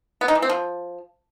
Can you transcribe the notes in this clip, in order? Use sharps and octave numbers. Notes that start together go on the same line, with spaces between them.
B3
D#4
E3
C4
F3